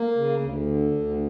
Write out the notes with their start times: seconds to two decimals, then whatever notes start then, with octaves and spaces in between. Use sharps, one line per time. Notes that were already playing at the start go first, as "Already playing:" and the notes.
Already playing: A#3
0.16 C#3
0.41 D2
0.66 D3
0.91 D2